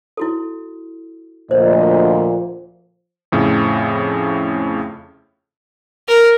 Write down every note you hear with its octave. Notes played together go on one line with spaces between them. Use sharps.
E4 F#4 A4
D2 A#2 F3 C5 D#5
F2 A2 C#3
A#4